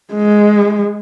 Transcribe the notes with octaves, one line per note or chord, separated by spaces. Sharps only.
G#3